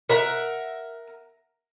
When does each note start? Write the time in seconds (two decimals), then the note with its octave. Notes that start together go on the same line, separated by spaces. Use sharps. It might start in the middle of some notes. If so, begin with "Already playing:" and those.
0.09 A#4 E5 F#5